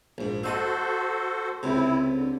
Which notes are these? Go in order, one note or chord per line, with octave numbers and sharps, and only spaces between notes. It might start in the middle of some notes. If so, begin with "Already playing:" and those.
A#1 G#2
E4 F#4 A4 C5 D#5
C#2 C3 C4 E4
D3